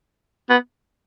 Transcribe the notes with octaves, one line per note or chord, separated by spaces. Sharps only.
B3